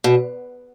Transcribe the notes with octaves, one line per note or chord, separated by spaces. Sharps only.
B2